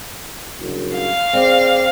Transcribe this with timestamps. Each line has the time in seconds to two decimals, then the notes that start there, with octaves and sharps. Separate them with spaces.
0.60 F#1 G2
0.96 F5
1.33 C4 G#4 D5